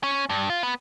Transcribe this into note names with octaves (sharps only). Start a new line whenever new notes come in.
C#4
G2
F4
B3